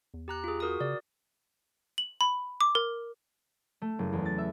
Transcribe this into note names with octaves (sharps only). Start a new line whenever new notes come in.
E2
G4 A#5 F#6
F4 G#4
F#4 A#4 D#6
C#3 D5
F#7
B5
D6
A#4
A3
F#1
E2
A6
E5